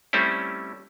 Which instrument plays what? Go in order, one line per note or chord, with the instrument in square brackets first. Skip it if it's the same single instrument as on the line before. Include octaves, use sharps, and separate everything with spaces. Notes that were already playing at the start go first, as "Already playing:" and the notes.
[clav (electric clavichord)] G3 A3 C4 C#4 E4